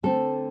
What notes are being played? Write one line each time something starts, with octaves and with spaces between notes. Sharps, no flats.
D3 A3 C4 A4